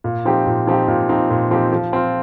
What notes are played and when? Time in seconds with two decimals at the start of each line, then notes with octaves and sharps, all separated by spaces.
0.04 A#2
0.25 F3 C4 D#4 G4
0.46 A#2
0.67 F3 C4 D#4 G4
0.88 A#2
1.09 F3 C4 D#4 G4
1.30 A#2
1.51 F3 C4 D#4 G4
1.73 F3
1.93 C4 F4